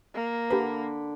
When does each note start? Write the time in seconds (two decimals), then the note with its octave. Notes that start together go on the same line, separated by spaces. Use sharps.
0.14 A#3
0.50 D3 G4 B4 B5